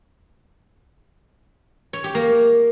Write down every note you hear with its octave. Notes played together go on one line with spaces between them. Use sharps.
C#5
G4
A#3